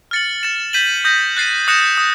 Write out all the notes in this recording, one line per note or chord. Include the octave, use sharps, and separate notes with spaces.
F6 A6 C#7 F#7
A6 C#7 E7
G6 B6 D#7 F#7
D#6 G6 A#6
F#6 A6 C7 D#7
D#6 F#6 A#6 C#7 E7
D#6